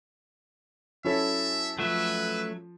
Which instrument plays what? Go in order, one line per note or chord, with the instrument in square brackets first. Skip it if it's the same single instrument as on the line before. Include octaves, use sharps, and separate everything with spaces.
[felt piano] F#3 E4 C#5 [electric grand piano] C#4 A4 [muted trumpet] E5
[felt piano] F3 [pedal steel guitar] F#3 A3 E5 [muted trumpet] B4